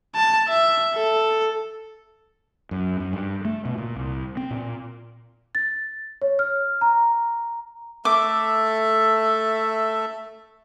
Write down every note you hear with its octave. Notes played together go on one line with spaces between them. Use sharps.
A5
E5
A4
F#2
F#2
G2
A3
B2
A#2
C2
C4
A#2
A6
C#5
F6
A#5
A3 A4 E5 D6